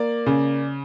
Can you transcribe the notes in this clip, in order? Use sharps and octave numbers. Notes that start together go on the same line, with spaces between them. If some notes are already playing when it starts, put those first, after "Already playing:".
Already playing: A#3 D5
C#3